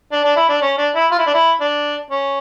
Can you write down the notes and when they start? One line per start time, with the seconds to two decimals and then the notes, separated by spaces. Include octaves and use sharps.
0.12 D4
0.24 D4
0.36 E4
0.49 D4
0.62 C#4
0.78 D4
0.95 E4
1.12 F4
1.19 E4
1.27 D4
1.34 E4
1.61 D4
2.10 C#4